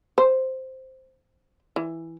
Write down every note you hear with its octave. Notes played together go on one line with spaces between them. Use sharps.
C5
E3